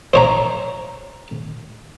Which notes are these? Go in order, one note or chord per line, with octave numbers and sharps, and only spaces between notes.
C5 C#5 A#5